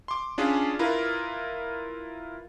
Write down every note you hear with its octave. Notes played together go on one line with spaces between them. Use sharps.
C6 D6
C#4 D4 F4 G#4
E4 F4 A#4 B4